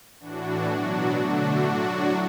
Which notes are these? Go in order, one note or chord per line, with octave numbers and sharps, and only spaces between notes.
A2 E3 D4 F#4
B2 F#3 D4 F#4
D3 A3 D4 F#4
A2 F#3 D4 F#4